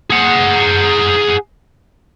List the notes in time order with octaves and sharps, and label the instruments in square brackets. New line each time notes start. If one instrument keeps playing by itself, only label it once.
[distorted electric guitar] G#4 F#5